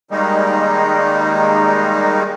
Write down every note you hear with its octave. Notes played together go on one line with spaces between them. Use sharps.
D#3 G3 G#3 A#3 D#4